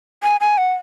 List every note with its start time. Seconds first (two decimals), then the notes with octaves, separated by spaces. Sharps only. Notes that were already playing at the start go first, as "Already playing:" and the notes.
0.23 G#5
0.41 G#5
0.58 F#5